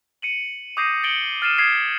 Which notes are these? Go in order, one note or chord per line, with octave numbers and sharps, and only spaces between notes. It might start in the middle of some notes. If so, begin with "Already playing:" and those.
C#7 D#7 F#7
D6 D#6 G6 A#6 C7 D#7
A6 C#7 D7 F#7 G7
F6 A6 C7 D#7 E7
D#6 G#6 B6 C7